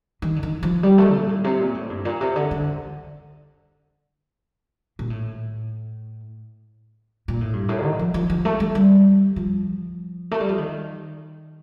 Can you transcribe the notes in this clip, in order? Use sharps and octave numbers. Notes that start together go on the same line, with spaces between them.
D#3
D3
D#3
F3
G3
A3
A#2
A2
C3
A#2
A2
G2
A#2
C3
D3
D3
A#2
A2
A#2
A2
G2
A2
D#3
F3
F3
F3
A3
A3
G3
F3
A3
G3
F3
D#3